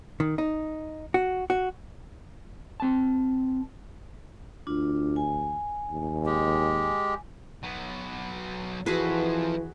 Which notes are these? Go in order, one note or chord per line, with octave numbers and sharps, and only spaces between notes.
D#3
D#4
F#4
F#4
C4 A5
D2 D4 F4
G#5
D#2
G#3 G4
F#3 B3
E3 F3 F#4 G#4 A4 B4